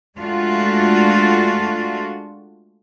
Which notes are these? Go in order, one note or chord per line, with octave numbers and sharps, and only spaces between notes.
G#3 A3 D4 F4 F#4